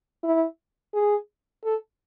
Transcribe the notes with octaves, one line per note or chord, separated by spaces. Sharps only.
E4
G#4
A4